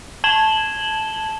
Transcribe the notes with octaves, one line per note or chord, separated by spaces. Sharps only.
A5 G#6 E7 F#7 G7